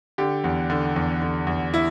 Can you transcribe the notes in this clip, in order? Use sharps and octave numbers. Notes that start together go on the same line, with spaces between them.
D3 G4
E2
D3
E2
D3
E2
E4